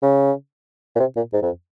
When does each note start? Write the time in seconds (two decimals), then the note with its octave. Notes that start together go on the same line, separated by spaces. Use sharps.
0.03 C#3
0.96 A#2
1.00 C3
1.16 A#2
1.33 G#2
1.42 F2